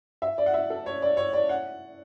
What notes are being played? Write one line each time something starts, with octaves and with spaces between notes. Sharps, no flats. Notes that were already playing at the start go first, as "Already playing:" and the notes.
E5
D5
F#5
E5
A4
C#5
D5
C#5
D5
F#5